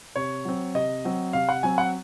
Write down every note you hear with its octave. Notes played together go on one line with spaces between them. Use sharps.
C3 C#5
F#3 C4
C3 D#5
F#3 C4
C3 F5
F#5
F#3 C4 G#5
F#5